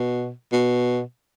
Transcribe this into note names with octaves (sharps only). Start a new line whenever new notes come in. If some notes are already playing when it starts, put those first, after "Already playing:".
Already playing: B2
B2